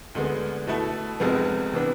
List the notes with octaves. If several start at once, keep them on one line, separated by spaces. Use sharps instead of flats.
D2 D3 G#3 B3
B2 A3 E4 A4
F1 F2 C3 G#3 B3
C3 E3 B3 D4